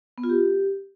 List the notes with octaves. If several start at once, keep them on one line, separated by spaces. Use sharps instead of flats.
B3
F4
G4